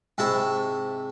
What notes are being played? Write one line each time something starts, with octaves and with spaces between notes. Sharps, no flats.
G#2 C3 E4 A5 C#6